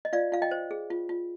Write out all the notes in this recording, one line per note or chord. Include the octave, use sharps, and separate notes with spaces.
D#5
F4 D5 F5
F4 F5
D#5 G5
C5
G#4
F4
F4